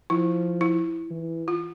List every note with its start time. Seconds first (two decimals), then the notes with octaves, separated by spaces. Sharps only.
0.10 F3 E4
0.61 E4
1.11 E3
1.48 F4